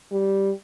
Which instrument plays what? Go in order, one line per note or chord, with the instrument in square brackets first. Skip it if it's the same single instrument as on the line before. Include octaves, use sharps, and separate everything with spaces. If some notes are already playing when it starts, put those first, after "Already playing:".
[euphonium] G3